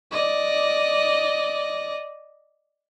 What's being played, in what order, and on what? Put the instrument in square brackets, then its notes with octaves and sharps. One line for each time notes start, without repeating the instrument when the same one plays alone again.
[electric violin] D5 D#5